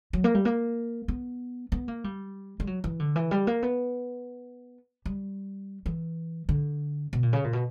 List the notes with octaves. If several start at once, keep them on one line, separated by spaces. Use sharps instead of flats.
F#3
A#3
G3
A#3
B3
B3
A#3
G3
G3
F#3
E3
D3
E3
G3
A#3
B3
G3
E3
D3
B2
A#2
C#3
A#2
B2